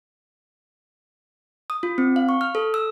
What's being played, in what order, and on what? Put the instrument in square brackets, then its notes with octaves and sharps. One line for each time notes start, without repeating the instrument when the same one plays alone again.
[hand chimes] D#6
F4
C4
F5
C#6
F6
A4
E6